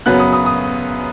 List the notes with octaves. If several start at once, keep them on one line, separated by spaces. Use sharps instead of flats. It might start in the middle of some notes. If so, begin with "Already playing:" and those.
F#2 C#3 F#3 B3 F#6
D#6
D#6
D#6